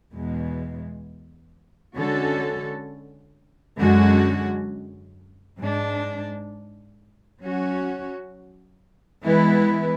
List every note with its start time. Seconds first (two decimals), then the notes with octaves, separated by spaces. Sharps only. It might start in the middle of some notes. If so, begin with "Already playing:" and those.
0.14 E2 B2 G#3
1.97 D3 G#3 C#4 F#4 A4
3.79 F#2 D3 G#3 C#4 F#4
5.60 G#2 G#3 D4
7.41 F#3 C#4 F#4
9.23 E3 G#3 B3 E4 B4